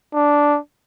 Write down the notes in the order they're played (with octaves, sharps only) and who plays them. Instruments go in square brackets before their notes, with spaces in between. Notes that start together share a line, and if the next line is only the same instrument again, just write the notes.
[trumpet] D4